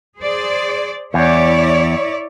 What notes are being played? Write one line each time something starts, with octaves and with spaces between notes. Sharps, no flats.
G#4 C5 D5
E2 E4 C#5 D5